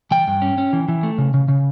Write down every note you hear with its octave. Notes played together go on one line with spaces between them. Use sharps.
E3 G5
G2
C#4
C#4
E3
E3
A3
C#3
C#3
C#3